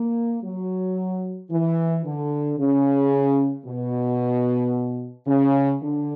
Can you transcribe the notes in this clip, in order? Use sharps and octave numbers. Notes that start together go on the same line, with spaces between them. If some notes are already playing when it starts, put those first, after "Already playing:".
Already playing: A#3
F#3
E3
D3
C#3
B2
C#3
D3